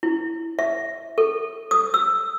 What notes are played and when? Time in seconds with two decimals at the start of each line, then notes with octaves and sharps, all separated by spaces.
0.03 E4
0.59 E5
1.18 A4
1.71 D#6
1.94 E6